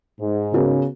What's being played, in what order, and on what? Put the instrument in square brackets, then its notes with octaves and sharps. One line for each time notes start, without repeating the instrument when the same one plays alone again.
[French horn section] G#2
[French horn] C#3 [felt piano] B3 F#4 A#4